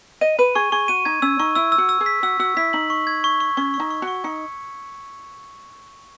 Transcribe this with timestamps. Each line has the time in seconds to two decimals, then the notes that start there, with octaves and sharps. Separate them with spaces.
0.21 D#5 D#7
0.39 B4 D#7
0.55 G#4 C#6
0.72 G#4 C#6
0.88 F#4 D#7
1.05 D#4 G#6
1.22 C#4 E6
1.39 D#4 C#6
1.55 E4 E6
1.72 E6
1.78 F#4
1.89 E6
2.01 G#4
2.06 B6
2.23 F#4 E6
2.39 F#4 E6
2.57 E4 B6
2.73 D#4 F#7
2.90 C#6
3.07 G#6
3.24 C#6
3.40 C#6
3.57 C#4 C#6
3.74 C#6
3.80 D#4
3.90 C#6
4.02 F#4
4.08 C#6
4.24 D#4 C#7